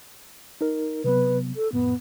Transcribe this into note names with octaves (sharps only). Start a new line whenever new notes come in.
D#4 A#4
C3 F#3 B3 B4
A4
F2 A2 B3